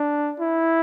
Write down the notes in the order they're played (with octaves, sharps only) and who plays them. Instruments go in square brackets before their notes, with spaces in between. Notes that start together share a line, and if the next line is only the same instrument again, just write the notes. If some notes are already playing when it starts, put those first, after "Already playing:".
Already playing: [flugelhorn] D4
E4